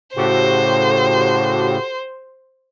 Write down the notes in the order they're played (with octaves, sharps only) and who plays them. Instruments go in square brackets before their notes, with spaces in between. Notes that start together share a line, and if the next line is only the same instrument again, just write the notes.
[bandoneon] A2 C#3 [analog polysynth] F#4 G4 A4 [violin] C5